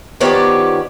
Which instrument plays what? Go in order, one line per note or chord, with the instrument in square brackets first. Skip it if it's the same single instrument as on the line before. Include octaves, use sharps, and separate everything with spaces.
[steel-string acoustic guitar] D#3 F3 B3 G4 C#5 D5